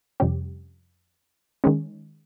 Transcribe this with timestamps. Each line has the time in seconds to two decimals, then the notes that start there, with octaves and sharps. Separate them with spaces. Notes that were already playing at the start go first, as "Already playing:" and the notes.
0.20 F2 C3 G3 C#4 G4
1.64 D#3 G#3 C#4